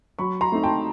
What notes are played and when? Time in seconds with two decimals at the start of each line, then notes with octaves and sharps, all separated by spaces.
0.19 F#3 B5 C#6
0.41 A#5 C6
0.52 A3 C4 D#4
0.63 G5 A5